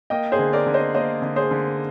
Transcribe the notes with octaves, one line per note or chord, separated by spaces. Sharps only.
A#3 D#5 G5
G#4 C5
D3
A#4 D5
D3
C5 D#5
A#3 C5 D#5
D3
G#4 C5
D3